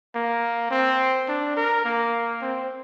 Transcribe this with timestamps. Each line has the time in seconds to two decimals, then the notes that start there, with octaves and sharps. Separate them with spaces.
0.15 A#3
0.71 C4
1.29 D4
1.57 A#4
1.85 A#3
2.42 C4